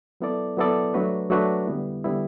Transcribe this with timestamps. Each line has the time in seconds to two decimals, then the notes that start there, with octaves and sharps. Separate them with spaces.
0.20 F#3 B3 E4 A4 D5
0.57 F#3 B3 E4 A4 D5
0.94 F#3 A3 D4 F#4 B4
1.30 F#3 A3 D4 F#4 B4
1.67 D3 G3 B3 E4
2.04 D3 G3 B3 E4